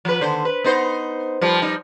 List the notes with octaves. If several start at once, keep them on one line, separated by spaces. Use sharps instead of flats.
F3 B4
D#2 D3 C5
B4
B3 D#4 C5
F3 G3
F3 G3 D#4